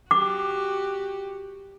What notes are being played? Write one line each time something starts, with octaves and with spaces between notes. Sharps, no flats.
F#4 G4 D6